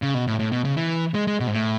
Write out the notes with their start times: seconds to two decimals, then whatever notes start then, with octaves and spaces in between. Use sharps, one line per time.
0.02 C#3
0.14 B2
0.27 A2
0.40 A2
0.52 B2
0.65 C#3
0.77 E3
1.14 G#3
1.27 G#3
1.40 B2
1.47 G#2
1.52 A2